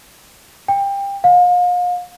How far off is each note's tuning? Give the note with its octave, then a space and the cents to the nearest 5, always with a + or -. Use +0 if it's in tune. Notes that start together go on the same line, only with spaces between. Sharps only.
G5 +25
F5 +35